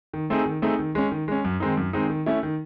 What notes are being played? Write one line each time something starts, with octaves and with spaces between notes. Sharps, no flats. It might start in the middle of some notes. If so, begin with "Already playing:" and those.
D#3
A3 C4 D#4 G#4
D#3
A3 C4 D#4 G#4
D#3
G#3 C#4
D#3
G#3 C#4
F#2
D#3 G#3 C4 D#4
F#2
D#3 G#3 C4 D#4
D#3
A3 C#4 E4
D#3